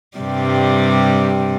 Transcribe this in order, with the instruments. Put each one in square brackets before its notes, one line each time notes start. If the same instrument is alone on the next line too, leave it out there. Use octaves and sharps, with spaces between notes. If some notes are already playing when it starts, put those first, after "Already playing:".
[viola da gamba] G2 C3 G3